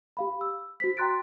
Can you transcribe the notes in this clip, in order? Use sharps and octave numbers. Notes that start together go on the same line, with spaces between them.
G4 F5 B5
E6
F#4 C5 B6
G5 A#5 C6 F#6 A6 D7